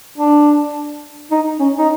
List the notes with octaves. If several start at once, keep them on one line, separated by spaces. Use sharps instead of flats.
D4
D#4
C#4
D#4